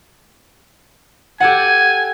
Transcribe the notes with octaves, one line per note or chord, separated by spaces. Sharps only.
G4 A4 F#5 G#5